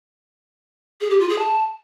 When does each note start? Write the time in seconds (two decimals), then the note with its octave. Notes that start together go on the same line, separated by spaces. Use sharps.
1.01 G#4
1.10 G4
1.20 F4
1.29 G#4
1.39 A5